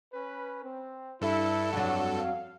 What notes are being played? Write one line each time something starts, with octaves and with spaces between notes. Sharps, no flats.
C#4 B4
C4
G2 E4 A4
F2 F#3 D4 F#4 F#5
F5